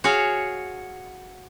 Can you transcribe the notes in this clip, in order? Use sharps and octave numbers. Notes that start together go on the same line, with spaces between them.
F#4 G#4 C#5 F5